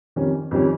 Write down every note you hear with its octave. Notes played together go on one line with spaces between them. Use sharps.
F2 D#3 G3 C#4
F2 D#3 G3 C#4